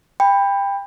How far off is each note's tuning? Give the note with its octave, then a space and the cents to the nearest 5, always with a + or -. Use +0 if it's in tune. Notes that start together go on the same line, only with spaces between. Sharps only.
G5 +25 B5 +5